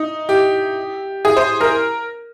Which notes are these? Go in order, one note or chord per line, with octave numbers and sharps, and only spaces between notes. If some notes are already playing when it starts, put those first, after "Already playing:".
Already playing: D#4
G4
G#4
C5
A#4